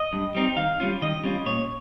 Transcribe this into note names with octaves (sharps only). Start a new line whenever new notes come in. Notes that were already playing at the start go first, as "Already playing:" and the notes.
Already playing: D#5
G2
G3 C4 D#4
D#3 F5
G3 C#4 F4
D#3 D#5
G3 C#4 F4
A#2 C#5